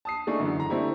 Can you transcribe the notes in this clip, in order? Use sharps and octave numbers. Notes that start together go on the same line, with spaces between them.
A5 D#6 C7
A3 D4 D#4 G#4
F#2 D3 E3
F#1 A#5
A3 C4 D4 E4 G4